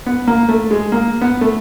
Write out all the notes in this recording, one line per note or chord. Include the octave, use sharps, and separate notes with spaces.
B3
A#3
A3
G#3
A#3
B3
A3